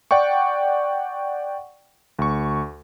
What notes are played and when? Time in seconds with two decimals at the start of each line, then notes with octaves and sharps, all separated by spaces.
0.11 D5 F#5 G5 C#6
2.19 D2 C#6